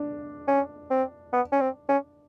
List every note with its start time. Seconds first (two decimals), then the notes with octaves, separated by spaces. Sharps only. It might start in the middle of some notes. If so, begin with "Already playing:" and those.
Already playing: D4
0.48 C#4
0.90 C4
1.33 B3
1.52 C#4
1.61 C4
1.89 C#4